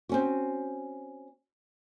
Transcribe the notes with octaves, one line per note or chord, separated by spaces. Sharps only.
C4 C#4 F#4